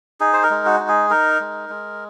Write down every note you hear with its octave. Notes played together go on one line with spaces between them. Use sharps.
D#4 G#4
C5
A#4
G#3
F#4
D#4
G#4
D#4 A#4
G#3
G#3